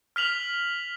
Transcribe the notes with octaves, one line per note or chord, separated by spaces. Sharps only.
F6 B6 F7 F#7